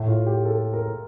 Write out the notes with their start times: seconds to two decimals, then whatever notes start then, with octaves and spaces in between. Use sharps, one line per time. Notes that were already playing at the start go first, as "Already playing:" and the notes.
Already playing: A2
0.08 F4
0.26 G4
0.45 A4
0.73 A#4